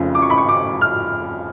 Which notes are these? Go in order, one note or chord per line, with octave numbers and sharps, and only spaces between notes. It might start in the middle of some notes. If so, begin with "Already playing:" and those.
Already playing: F1 F2 C#3 F3
D6
C#6
B5
C#6
D6
F6